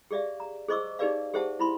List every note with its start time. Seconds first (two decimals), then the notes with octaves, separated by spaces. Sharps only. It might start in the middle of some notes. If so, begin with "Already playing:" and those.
0.11 G4 G#4 D5 E5 F5
0.40 A#5
0.68 G#4 C5 D#5 C#6 D6 E6
0.99 D#4 G4 G#4 B4 D5 F5
1.33 G4 G#4 C5 E5 F#5 A5
1.59 E4 B5 C6